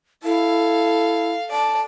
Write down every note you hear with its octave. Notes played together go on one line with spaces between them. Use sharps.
E4 A4 F5
D5 A5